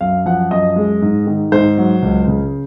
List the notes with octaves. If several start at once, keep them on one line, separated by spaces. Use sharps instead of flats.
F#2 F5
F3 F#5
F#2 D#5
G#3
G#2
D#3
G#2 C5
F#3
C#2
C#3